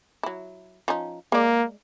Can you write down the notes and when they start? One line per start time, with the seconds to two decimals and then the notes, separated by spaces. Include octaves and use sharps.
0.23 F#3 E4
0.88 F3 C#4 D#4
1.32 G#3 A#3 D5